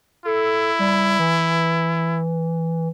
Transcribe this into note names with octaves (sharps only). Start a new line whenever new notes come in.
E4 A4
G3
E3